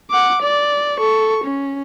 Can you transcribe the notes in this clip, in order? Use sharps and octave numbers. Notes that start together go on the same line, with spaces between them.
F#5 D6
D5
A4 C#6
C#4